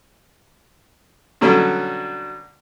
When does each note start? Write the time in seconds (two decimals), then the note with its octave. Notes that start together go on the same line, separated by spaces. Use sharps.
1.41 B2 D3 F#3 G3 C#4